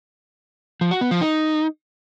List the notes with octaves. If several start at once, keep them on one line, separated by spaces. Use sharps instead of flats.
F3
F#4
B3
F3
D#4